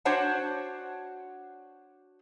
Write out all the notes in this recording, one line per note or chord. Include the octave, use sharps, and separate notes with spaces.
D4 F#4 C5 C#5 F#5 A5